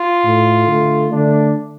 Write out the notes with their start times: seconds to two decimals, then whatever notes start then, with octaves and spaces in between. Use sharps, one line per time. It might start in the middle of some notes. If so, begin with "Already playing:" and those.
Already playing: F4
0.24 A2 A3
0.67 D3 A3
1.10 D3 A3 D4